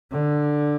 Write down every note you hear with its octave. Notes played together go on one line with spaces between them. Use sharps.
D3